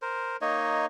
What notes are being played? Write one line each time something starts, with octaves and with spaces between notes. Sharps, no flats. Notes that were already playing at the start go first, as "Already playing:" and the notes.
A#4 C5
A#3 D#4 C#5 D#5